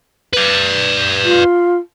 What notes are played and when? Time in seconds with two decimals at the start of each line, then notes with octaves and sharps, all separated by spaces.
0.33 B4 D5
1.23 F4